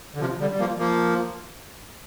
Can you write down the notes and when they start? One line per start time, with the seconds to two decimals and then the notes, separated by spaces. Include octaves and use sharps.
0.14 D3
0.20 C3 F3
0.40 D3 G3
0.51 G3
0.59 F3 A#3
0.79 F3 A#3